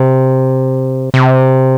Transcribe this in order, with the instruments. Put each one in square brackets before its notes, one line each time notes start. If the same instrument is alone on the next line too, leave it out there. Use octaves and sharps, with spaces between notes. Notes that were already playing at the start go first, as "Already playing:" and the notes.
Already playing: [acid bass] C3
C3